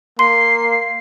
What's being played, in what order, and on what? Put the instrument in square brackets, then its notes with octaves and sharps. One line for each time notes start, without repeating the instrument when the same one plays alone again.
[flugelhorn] A#3 [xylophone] C6 [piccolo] C7